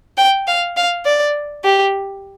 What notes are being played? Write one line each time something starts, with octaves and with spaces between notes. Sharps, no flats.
G5
F5
F5
D5
G4